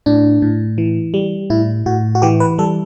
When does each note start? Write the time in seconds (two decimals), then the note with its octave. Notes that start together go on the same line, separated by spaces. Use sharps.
0.06 A2 D4
0.42 A2
0.78 E3
1.14 G3
1.50 A2 E4
1.86 A2 F#4
2.15 F#4
2.22 E3 G4
2.40 B4
2.58 G3 A4